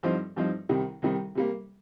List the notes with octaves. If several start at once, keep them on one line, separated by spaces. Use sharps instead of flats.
G2 F3 C4 D#4
G2 F3 C4 D#4
C2 C3 D#3 G3
C2 C3 D#3 G3
C3 G3 A#3